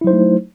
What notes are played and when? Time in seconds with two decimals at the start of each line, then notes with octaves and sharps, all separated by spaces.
0.01 E4
0.04 F#3
0.07 C5
0.10 D#4
0.13 A3